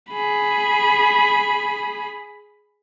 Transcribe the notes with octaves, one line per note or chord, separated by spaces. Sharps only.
G#4 B5